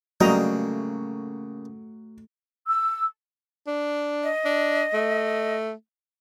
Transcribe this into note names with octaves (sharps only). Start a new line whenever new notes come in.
C#3 F#3 G3 A3 A#3 D#5 G5 A#5
E6
D4
D#5
D4
A3